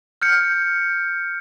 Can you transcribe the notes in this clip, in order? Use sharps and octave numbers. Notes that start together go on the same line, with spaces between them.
F6 G6 C#7